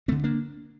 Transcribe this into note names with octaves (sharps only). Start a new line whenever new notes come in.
D2 D3 A3 C4
A#3 D4